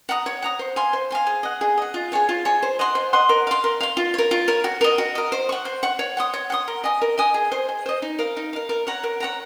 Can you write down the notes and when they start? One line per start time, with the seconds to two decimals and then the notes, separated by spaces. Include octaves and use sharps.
0.09 F#5 A#5 D#6
0.26 C#5
0.42 F#5 A#5 D#6
0.59 C5
0.76 F5 G#5 C6
0.93 C5
1.11 F5 G#5 C6
1.27 G#4
1.43 D#5 F#5
1.61 G#4
1.77 D#5 F#5
1.94 F4
2.12 G#4 C#5 G#5
2.29 F4
2.45 G#4 C#5 G#5
2.62 C5
2.79 D#5 F#5 C6
2.95 C5
3.13 D#5 F#5 C6
3.29 A#4
3.47 F5 C6
3.64 A#4
3.81 F5 C6
3.97 F4
4.14 A#4 C#5
4.31 F4
4.48 A#4 C#5
4.64 F#4
4.81 A#4 D#5
4.98 F#4
5.15 A#4 D#5
5.32 C5
5.49 F#5 C#6
5.65 C5
5.83 F#5 C#6
5.99 C#5
6.17 F#5 C6 D#6
6.34 C#5
6.50 F#5 C6 D#6
6.68 A#4
6.84 D#5 G#5 D#6
7.02 A#4
7.18 D#5 G#5 D#6
7.34 G#4
7.52 C5 D#5
7.69 G#4
7.86 C5 D#5
8.02 D#4
8.19 A#4 F5
8.37 D#4
8.53 A#4 F5
8.69 A#4
8.87 C#5 F#5 A#5
9.04 A#4
9.20 C#5 F#5 A#5